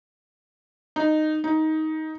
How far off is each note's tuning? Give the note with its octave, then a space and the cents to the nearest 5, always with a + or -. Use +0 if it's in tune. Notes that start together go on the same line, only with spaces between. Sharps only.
D#4 -10
D#4 +15